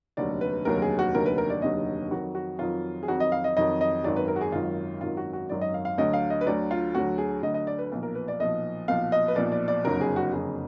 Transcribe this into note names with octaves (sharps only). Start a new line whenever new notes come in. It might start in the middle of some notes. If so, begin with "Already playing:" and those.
F1 D#2 D3 F#3 D5
B4
F1 D#2 D3 F#3 A#4
G#4
F#4
F1 D#2 D3 F#3 A#4
B4
A#4
D5
F1 D#2 D3 F#3 D#5
F2 D#3 F#3 F#4
F#4
F2 D#3 F#3 F4
G#4
F2 D#3 F#3 F#4
D#5
F5
D#5
F2 D#3 F#3 D#5
D#5
G#1 F#2 D#3 F#3 D5
B4
A#4
F#4
G#4
G#1 F#2 D#3 F#3 F4
G#1 F#2 D#3 F#3 F4
F#4
F#4
G#1 F#2 D#3 F#3 D5
D#5
F5
F5
D2 D3 F#3 D#5
F5
D#5
B4
D2 D3 F#3 D5
F4
D2 D3 F#3 F#4
G#4
D2 D3 F#3 D#5
D#5
D5
B4
B1 A#2 F3
A#4
B4
D5
B1 A#2 F3 D#5
B1 A#2 F3 F5
D#5
B4
B1 A#2 F3 D5
D5
D5
F#1 F2 D3 F#3 A#4
G#4
F#4
F#1 F2 D3 F#3 G#4